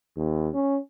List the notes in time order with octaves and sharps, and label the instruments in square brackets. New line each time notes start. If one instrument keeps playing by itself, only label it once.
[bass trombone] D#2
C#4